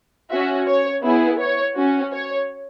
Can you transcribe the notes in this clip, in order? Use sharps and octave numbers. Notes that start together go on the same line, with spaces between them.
C#4 F#4 E5
C#5
B3 E4 G#4
C#5
C#4 F#4
C#5